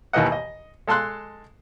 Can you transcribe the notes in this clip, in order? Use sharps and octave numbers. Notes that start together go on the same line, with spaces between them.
D#2 D#3 E3 B4 D#5 F#5
D#5
G#3 A4 A5 C6 F#6